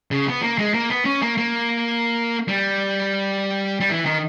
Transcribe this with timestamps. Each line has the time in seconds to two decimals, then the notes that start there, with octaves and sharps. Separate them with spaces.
0.11 C#3
0.27 B3
0.43 A#3
0.59 G#3
0.74 A#3
0.90 B3
1.05 C#4
1.22 A#3
1.38 A#3
2.48 G3
3.80 G3
3.90 E3
4.06 D#3